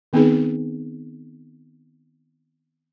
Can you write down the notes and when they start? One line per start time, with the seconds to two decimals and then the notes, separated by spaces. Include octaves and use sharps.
0.13 D#3 B3 C4 D#4 G#4 B4